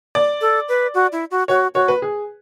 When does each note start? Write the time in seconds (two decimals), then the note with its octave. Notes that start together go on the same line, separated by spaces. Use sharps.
0.15 D5
0.41 A4
0.68 B4
0.94 F#4
1.12 E4
1.31 F#4
1.48 F#4 C#5
1.74 F#4 C#5
1.88 B4
2.02 G#4